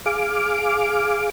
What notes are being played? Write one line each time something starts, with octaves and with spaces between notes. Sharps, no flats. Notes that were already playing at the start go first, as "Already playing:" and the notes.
G#4 F5 D6